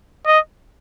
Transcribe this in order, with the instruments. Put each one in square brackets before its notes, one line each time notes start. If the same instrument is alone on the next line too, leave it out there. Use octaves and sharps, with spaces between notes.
[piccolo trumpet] D#5